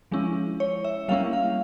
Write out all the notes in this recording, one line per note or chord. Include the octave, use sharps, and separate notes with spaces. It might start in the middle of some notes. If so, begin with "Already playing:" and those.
F3 G#3 C#4 E4
C#5
E5
G3 A#3 C#4 E4 F5
F5